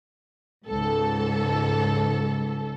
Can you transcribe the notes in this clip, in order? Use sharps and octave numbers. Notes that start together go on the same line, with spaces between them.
C#2 G#2 A4